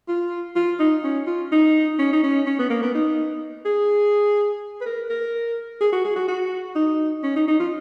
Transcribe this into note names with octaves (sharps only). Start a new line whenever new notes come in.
F4
F4
D#4
C#4
F4
D#4
C#4
D#4
C#4
C#4
B3
A#3
B3
D#4
G#4
B4
A#4
A#4
G#4
F#4
G#4
F#4
F#4
D#4
C#4
D#4
D#4
F4